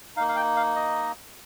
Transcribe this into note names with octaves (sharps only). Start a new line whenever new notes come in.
A#3 D#4 F5
F5
G5
F5
D#5